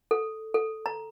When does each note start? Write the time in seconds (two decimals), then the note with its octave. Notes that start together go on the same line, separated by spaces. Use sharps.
0.11 A4
0.54 A4
0.86 A#5